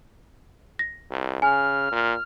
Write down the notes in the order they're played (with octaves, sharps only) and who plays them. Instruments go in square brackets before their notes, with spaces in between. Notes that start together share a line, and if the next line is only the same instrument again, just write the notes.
[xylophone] A#6
[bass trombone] C2
[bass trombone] C#3 [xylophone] G#5 [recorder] F6
[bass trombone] A#2